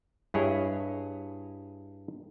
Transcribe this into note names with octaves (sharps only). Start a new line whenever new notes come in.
G2 E4 G#4 C#5 D#5